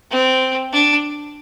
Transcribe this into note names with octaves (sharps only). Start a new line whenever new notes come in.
C4
D4